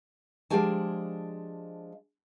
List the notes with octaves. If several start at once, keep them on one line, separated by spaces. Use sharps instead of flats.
F3 G#3 D4 G4 G#5 A5